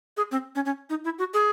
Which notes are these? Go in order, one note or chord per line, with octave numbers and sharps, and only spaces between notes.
G#4
C4
C#4
C#4
D#4
E4
F#4
G#4